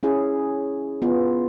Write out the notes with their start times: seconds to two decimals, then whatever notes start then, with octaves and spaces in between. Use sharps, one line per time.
0.03 C#4 E4 G#4
1.02 B3 F4